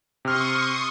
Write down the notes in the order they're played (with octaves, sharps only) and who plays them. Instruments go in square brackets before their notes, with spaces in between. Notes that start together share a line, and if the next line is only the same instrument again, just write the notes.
[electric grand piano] C3 F6 [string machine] C6 C#6 D#6